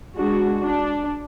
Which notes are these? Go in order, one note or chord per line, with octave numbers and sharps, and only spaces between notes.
G#3 D4 F#4
D4